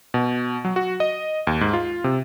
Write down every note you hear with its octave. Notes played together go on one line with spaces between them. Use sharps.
B2
F#3
F#4
D#5
D#2
G#2
F4
C3